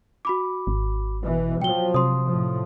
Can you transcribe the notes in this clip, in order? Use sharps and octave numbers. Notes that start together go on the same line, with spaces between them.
F#4 B5 D6
G#1
B2 E3
F3 F#3 G5 G7
C3 C6 D#6
A2 F3